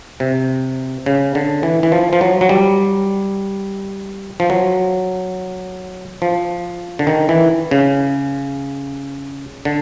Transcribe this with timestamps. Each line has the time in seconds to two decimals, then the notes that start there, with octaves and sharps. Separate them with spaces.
0.20 C3
1.06 C#3
1.35 D3
1.63 E3
1.83 E3
1.92 F3
2.13 F3
2.21 F#3
2.41 F#3
2.49 G3
4.40 F3
4.50 F#3
6.22 F3
6.99 D3
7.07 D#3
7.29 E3
7.71 C#3
9.65 D3